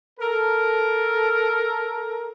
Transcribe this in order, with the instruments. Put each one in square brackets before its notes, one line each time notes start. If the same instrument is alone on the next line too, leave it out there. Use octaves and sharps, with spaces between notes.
[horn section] A4 A#4